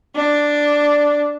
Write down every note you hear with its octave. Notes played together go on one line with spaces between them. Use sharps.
D4